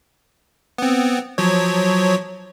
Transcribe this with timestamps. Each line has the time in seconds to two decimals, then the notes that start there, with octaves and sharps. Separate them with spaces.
0.78 B3 C4
1.38 F3 F#3 C#5